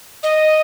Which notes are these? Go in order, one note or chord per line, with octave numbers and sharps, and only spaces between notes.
D#5